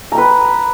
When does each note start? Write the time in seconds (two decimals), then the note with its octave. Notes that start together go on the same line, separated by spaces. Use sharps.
0.12 A#5
0.15 G5
0.18 B4